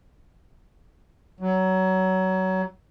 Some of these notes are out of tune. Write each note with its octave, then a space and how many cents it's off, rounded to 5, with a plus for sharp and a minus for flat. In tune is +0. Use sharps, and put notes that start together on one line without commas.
F#3 +20